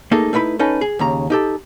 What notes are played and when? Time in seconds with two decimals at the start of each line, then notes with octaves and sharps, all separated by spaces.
0.11 A3 A#3 D#4 G#4 A4
0.33 A3 D#4 E4 B4 B5
0.59 C#4 D#4 A4 B4
0.81 G#4
0.99 D#2 C#3 A#5
1.30 D#4 G4 A4